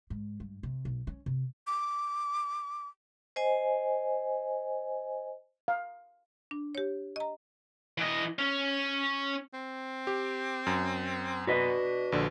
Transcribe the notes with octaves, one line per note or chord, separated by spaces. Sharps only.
G#2
G2
C3
B1
C#4
C3
D6
C5 D#5 G#5
F5
D4
G4 C#5
D#5 A#5
E3 D#5
C#4
C4
G4
F#2
D4 F#4 B4 D#5
A#1 D3